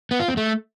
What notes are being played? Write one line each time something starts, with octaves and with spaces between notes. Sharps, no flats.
B3
F4
C4
A3